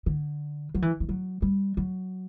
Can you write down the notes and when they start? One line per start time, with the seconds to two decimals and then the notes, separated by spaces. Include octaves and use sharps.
0.06 D3
0.75 F#3
0.82 E3
1.00 E3
1.09 F#3
1.42 G3
1.77 F#3